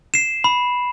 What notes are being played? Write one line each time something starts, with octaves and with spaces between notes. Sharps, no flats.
C7 E7
B5